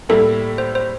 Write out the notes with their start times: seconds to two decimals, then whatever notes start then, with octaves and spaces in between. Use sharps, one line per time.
0.09 A2 G3 A#3 E4 A4
0.58 C5
0.75 C5